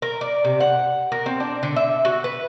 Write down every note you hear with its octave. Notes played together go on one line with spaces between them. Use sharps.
A#4
D5
C3
F#5
A#4
C4
D4
D3
E5
F#4
B4